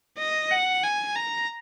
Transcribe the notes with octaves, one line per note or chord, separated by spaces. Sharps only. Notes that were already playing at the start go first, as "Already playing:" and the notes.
D#5
F#5
G#5
A#5